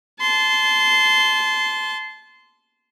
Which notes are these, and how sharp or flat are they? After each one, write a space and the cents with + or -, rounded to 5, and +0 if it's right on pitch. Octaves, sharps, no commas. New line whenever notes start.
A5 -25 C6 -15